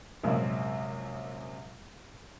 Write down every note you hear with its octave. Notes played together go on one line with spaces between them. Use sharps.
A#1 F#2 C3 G#3 A#3